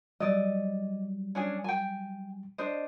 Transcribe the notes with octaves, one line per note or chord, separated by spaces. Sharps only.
F#3 G3 D5 D#5
C#4 D4 G#4
G5 G#5
D4 C5 D#5